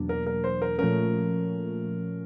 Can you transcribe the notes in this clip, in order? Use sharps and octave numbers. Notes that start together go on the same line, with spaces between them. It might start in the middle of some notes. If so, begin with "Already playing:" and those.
Already playing: E2 B2 F#3 A#3 D4
A#4
A#4
C5
A#4
A#2 F3 A3 C#4 A#4